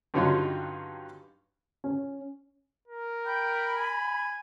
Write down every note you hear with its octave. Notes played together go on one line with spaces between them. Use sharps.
G2 D3 F#3 C#4 D#4 F4
C#4
A#4
G5 B5
G#5